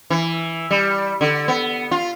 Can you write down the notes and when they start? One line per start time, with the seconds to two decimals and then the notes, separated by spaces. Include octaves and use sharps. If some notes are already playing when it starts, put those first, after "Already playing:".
0.10 E3
0.71 G3
1.21 D3
1.48 B3
1.91 F4